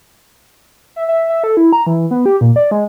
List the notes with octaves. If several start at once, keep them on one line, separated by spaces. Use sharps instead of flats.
E5
E5
E5
A4
E4
A#5
E3
B3
G4
A#2
D5
G#3